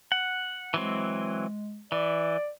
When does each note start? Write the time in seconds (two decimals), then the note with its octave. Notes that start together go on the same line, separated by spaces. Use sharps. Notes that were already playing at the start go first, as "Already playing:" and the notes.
0.12 F#5
0.74 E3 F#3 G#3 C4
1.92 E3 D5